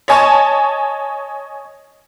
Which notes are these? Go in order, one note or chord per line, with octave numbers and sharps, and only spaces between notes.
C#5 D#5 G#5 A5 C#6